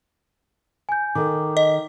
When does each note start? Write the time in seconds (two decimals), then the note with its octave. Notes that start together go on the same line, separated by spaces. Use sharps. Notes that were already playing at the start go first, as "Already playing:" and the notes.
0.89 G#5 G6
1.15 D#3 A4 D6
1.57 D#5